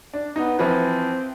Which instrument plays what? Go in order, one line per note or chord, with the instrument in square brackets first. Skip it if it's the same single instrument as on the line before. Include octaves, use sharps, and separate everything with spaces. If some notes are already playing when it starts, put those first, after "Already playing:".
[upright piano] D4
[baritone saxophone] B3 [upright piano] D#4
[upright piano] E3 F3 B4 [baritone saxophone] C4